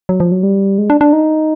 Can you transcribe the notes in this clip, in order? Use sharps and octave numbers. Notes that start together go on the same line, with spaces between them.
F#3
F3
F#3
G3
G#3
D4
D4
D#4